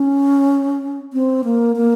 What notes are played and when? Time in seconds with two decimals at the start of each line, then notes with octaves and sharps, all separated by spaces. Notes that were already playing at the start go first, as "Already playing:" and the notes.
Already playing: C#4
1.13 C4
1.44 A#3
1.76 A#3